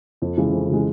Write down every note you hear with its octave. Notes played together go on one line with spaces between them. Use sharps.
F2
C#3 E3 G#3
F2
C#3 E3 G#3